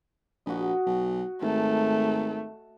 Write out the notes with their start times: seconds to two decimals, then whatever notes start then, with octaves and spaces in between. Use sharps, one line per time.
0.46 A#1 F#4 D#5
0.86 B1
1.42 G#1 A3